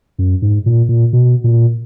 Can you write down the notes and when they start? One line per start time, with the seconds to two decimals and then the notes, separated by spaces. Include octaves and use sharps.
0.19 F#2
0.42 G#2
0.66 A#2
0.89 A#2
1.13 B2
1.44 A#2